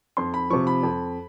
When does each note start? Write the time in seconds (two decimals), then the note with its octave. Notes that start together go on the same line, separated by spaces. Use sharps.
0.17 F2 C6
0.34 B5
0.50 C3 F3 C#6
0.67 B5
0.83 F2